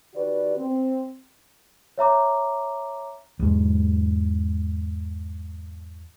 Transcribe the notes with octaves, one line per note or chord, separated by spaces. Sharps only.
D#3 F#4 G4 B4 D5
C4
C#5 E5 A#5 D6
E2 G#2